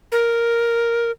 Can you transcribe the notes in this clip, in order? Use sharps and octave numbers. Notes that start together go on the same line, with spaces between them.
A#4